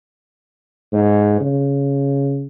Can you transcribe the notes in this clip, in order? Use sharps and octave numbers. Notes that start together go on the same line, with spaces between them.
G#2
C#3